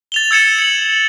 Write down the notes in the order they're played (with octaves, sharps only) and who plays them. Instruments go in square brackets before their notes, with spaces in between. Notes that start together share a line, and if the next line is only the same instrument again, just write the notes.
[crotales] A6 F7 G7
E6 G#6 C#7 E7
C#7 F#7